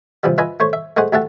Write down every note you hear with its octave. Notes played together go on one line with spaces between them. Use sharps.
C3 E3 F3 G3
F4 B4 D#5 E5 G#5
A3 C5 C#5
E5
G#3 A3 G#4 C5 F#5
D2 A3 G4 E5 F#5 A5